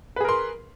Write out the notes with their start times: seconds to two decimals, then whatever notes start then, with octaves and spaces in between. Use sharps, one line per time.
0.16 B4
0.20 G#4
0.25 A#4
0.29 C6